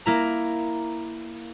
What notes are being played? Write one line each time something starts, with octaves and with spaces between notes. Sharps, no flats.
A#3 E4 A#5